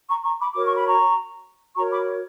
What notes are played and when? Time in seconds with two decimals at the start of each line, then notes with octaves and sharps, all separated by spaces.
0.09 A#5 C#6
0.24 A#5 C#6
0.39 B5 D6
0.55 F#4 A#4 C#5 D6
0.65 C#6
0.77 B5
0.87 A#5 C#6
1.76 F#4 A#4 C#5 A#5 C#6
1.92 B5 D6